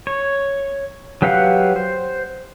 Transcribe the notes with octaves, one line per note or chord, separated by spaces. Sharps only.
C#5
F#3 G4 B4 F5 F#5
C5